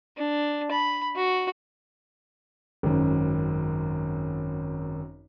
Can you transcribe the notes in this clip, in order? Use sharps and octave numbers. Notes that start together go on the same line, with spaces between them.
D4
B5
F#4
G#1 F#2